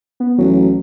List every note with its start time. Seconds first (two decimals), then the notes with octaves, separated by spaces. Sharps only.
0.20 B3
0.38 A1 F#3